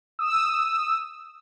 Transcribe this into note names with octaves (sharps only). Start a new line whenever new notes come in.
D#6 E6